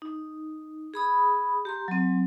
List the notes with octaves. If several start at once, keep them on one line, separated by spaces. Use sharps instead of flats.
D#4
G#4 B5 D#6
G4 A#5 C6
F#3 C4